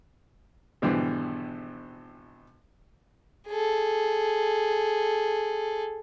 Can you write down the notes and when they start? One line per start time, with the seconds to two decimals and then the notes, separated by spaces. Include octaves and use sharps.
0.82 G#1 B2 D3 E3 G3
3.48 G#4 A4